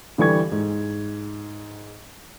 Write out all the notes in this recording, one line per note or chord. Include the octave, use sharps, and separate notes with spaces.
D3 E3 G3 C#6 G#6
G#2